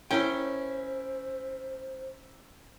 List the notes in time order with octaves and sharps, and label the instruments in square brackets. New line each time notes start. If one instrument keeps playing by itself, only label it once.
[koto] C#4 [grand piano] E4 A#4 G7 [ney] C5 [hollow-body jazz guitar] G5